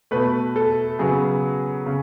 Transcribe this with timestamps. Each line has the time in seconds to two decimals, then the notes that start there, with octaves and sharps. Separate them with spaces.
0.11 B2 A3 B4
0.56 A4
0.99 C#3 F#3 B3 G#4
1.86 C#3